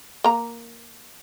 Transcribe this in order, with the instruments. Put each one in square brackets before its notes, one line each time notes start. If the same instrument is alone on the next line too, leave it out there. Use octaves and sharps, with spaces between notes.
[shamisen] A#3 A#5